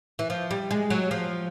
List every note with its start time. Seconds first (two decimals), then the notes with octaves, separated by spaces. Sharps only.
0.19 E3
0.30 F3
0.51 G3
0.71 G#3
0.90 F#3
1.11 F3